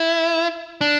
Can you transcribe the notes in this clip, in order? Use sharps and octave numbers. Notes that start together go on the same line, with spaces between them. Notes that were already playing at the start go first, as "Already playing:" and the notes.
Already playing: E4
D4